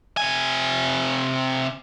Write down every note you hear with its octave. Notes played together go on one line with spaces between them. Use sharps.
C3 G#5